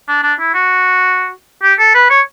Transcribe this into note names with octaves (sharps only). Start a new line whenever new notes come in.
D4
D4
E4
F#4
G4
A4
B4
C#5